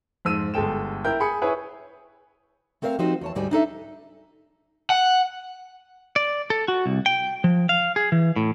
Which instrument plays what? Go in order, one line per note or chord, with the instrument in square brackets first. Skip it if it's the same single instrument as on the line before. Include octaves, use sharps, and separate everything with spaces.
[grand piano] F2 G#2 E6 D#7
G1 G#3 A4 G5 E7
E4 A#4 G5 G6
G#4 B5 C#7
E4 G#4 B4 C#5
[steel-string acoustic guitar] A3 C4 A#4 C5 E5 F5
F3 C4 D#4 F#4 G4 C5
E2 C#5 A5
D2 G#2 G3 A3 F#4 G#5
D4 D#4 A4 E5
[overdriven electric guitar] F#5
[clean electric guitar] D5
A4
F#4
C2
G5
F3
F5
G#4
E3
A2